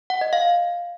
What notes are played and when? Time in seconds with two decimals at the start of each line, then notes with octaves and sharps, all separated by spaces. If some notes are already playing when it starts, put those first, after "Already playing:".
0.10 F#5
0.21 D#5
0.33 F5